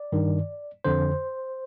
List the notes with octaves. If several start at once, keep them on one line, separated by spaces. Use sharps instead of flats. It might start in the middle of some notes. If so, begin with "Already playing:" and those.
Already playing: D5
G2 D#3
F2 D3 C5